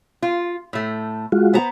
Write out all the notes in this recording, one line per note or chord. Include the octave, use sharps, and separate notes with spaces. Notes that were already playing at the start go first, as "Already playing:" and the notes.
F4
A2 A3
G#3 F4 F#4
B3 C5 A#5